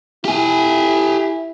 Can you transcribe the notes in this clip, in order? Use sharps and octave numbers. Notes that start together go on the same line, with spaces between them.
E4 G4 G#5